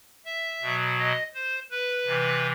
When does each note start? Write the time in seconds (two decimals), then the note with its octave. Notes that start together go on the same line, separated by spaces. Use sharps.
0.26 E5
0.62 B2 F#3
0.98 D#5
1.34 C5
1.71 B4
2.06 C3 E3